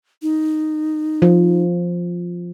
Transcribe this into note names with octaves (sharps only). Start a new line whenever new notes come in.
D#4
F3